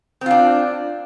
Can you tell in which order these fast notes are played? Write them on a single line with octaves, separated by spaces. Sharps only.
C4 F4 D4